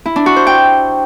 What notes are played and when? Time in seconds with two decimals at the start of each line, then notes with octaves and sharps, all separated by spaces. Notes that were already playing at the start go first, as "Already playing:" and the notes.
0.06 E4
0.16 D4
0.26 F#4
0.36 C5
0.47 G5